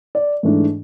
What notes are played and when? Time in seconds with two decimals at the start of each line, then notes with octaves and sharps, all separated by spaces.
0.15 D5
0.43 G#2 E3 A3 D4